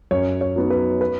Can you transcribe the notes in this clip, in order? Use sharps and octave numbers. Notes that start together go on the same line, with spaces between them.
F#2 C#5
C#5
F#3 B3 D#4
B4
B4